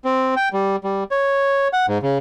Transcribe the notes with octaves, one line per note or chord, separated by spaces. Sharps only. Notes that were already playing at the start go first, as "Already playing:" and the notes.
C4
G5
G3
G3
C#5
F#5
G#2
C#3